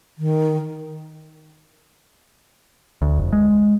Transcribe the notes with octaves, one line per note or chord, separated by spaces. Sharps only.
D#3
D2
F1
G#3